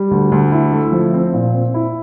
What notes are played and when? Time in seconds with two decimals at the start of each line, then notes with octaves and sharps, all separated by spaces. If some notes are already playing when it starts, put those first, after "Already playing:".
Already playing: G3
0.11 D2
0.32 D2
0.52 E4
0.72 A3
0.92 F3
1.13 C4
1.34 A#2
1.54 C4
1.74 E4